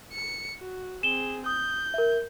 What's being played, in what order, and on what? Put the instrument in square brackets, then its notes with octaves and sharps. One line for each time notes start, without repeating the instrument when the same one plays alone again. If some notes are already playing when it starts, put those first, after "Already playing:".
[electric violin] C#7
F#4
[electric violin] C4 G#4 [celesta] E7 G7
[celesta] D#6 [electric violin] G6
[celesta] A#4 E5